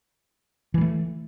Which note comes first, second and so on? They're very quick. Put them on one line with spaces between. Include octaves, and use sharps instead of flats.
E3 G3 A3